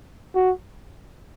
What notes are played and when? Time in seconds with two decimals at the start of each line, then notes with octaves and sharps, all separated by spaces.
0.35 F#4